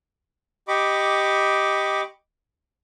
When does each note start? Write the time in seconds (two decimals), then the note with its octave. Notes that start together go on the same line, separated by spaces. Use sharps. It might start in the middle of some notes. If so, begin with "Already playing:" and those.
0.68 G4 D#5 B5 C#6 D6